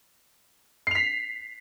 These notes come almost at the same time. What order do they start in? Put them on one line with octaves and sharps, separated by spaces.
C7 F7 B6